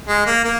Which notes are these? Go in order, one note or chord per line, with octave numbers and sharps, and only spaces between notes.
G#3
A#3
A#3